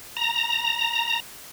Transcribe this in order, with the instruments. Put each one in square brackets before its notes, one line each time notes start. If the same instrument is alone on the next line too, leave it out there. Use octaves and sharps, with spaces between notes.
[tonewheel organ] A#5